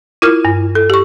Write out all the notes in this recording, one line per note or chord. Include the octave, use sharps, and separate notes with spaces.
E4 F4 A#4 F6
G2
A4
G4 C#6